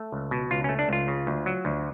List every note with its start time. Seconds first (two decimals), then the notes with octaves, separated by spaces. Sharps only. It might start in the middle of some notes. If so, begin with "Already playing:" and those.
Already playing: A3
0.12 C#2
0.31 B2
0.51 C#2 F4
0.64 A3 C#4
0.79 D4
0.89 C#2 F4
1.08 C#3
1.27 D2
1.46 F#3
1.65 D2